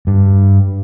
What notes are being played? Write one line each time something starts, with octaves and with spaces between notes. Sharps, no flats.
G2